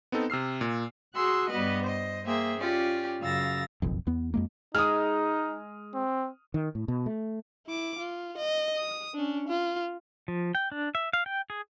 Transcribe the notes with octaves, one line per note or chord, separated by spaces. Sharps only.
B3 C4 D#4 A4
C3 E6 F6 C7
A#2
F#4 G#4 C6 E6 F#6
G2 G3 B3 B4 D#5
C5 D#5
A#3 G#4 C5 E5 G5
C#4 F4 G4 D5
F#2 C#3 F5 E6 A6 A#6
F#1 B1 F2
E2 B3
F2 G#3 A#3
G#3 D#4 D#6 F6
C4
D#3
A2
B2
A3
E4 D6
F4
D#5
D#6
C#4 D4
F4
F3
G5
D4
E5
F5
G5
G#4